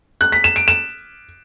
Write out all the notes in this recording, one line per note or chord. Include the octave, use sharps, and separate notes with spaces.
F#6
B6
E7
D7
E7